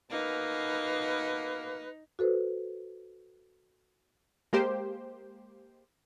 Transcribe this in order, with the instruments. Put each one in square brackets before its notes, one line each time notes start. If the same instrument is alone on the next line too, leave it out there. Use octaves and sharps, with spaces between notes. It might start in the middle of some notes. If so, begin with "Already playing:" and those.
[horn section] B2 A#3 [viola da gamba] D#4 [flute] B4
[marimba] F#4 A4 B4 C5
[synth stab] G#3 A#3 G4 C5